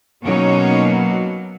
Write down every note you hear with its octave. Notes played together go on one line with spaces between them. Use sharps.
B2 F#3 A#3 C#4 D#4 C#5